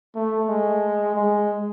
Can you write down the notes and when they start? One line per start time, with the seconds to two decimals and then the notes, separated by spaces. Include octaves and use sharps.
0.15 A3
0.48 G#3
1.16 G#3